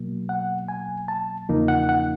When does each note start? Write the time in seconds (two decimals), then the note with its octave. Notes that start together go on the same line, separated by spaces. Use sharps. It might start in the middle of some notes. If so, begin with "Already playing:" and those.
Already playing: B2 F#3 A#3
0.29 F#5
0.68 G#5
1.08 A5
1.49 E2 C#3 F3 A#3 D#4
1.68 F#5
1.89 F#5